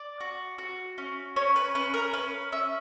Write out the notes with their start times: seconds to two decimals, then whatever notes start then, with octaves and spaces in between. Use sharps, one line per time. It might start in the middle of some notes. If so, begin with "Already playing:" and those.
Already playing: D5
0.20 F#4
0.58 F#4
0.98 C#4
1.36 C#4 C#5
1.56 B4
1.75 C#4 B4
1.94 A#4
2.13 C#4 B4
2.52 C#4 E5